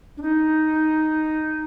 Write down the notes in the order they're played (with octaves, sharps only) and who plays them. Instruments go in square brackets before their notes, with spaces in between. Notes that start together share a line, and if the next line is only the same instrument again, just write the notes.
[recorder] D4
D#4